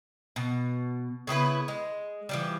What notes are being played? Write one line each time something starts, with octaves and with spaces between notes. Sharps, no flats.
B2
C#3 B3 E4 B4
G#3
E3 F3 G3